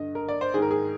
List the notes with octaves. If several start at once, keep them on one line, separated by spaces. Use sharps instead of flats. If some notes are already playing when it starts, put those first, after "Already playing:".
Already playing: G2 D3 D#5
A#4
D5
C5
G#2 D#3 G#4 A#4
G#4